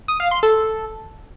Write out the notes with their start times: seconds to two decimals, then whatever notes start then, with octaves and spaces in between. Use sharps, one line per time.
0.08 D#6
0.20 F5
0.31 C6
0.43 A4